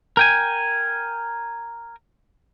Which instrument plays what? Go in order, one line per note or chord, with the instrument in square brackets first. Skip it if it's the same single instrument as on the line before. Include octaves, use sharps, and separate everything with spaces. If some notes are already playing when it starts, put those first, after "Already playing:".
[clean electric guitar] A#4 G5 G#5